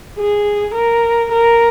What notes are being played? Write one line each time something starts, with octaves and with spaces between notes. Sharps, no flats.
G#4
A#4
A#4